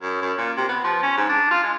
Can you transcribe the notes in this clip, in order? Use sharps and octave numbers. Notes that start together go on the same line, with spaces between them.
F#2
F#2
A#2
C3
B3
F3
C#4
G#2
D4
F4
G#3